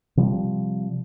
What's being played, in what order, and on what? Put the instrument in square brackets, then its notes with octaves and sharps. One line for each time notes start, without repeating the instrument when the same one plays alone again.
[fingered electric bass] C3 F3 G3